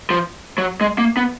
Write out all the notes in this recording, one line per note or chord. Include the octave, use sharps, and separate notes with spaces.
F3
F#3
G#3
A#3
B3